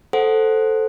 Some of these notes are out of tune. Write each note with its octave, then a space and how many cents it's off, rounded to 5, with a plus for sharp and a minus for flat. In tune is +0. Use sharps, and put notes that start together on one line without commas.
A4 +0 C5 +0 F#5 +0